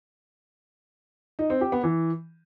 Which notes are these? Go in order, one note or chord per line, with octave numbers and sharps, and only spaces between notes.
D#4
C4
G4
B3
E3